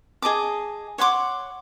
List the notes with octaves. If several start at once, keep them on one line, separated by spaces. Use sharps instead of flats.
G#4 D#5 A5 D6
C#5 F#5 C6 D6